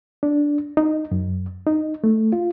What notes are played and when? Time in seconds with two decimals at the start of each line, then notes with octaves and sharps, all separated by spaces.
0.23 D4
0.77 D#4
1.12 F#2
1.66 D#4
2.04 A3
2.33 F4